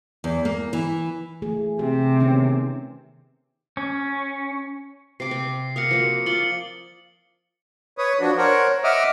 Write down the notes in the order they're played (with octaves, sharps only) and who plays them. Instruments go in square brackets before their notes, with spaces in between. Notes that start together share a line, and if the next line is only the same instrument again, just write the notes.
[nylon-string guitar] E2
A#3
E3
[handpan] E3 A3 G#4
[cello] C3 [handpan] G4
[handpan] D#3 B3 C#4
[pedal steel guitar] C#4
[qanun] C3 D6 [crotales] C7
[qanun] C4
[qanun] A#4 F5 F#5 [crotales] D#6 C#7
[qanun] F3 A#3 F#4
[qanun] F4 D5 [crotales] C#7 F#7 G7
[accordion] B4 C#5 D#6
F3 D4 F#4
A#4 C5 C#5 F#5
D#5 E5 F#5 D6 D#6 F6